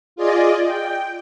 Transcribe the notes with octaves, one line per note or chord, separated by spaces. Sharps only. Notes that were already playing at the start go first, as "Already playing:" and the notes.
F4 G#4 D5 D#5
G5